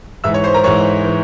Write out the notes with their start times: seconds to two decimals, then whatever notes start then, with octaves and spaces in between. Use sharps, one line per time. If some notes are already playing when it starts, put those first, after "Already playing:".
0.24 G#2 E3 E5 E6
0.34 C#5 C#6
0.44 C5 C6
0.54 A#4 A#5
0.64 G#2 E3 C#5 C#6
1.04 E3